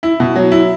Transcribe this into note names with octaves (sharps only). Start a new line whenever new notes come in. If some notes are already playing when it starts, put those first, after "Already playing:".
E4
B2
F#3
E4